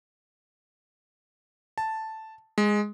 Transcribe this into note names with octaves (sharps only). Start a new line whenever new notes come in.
A5
G#3